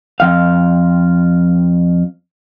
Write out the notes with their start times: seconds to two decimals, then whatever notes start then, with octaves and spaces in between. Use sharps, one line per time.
0.20 F2 F5